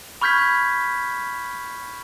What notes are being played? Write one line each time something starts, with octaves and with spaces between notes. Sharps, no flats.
B5 C#6 F6 G6 G#6 B6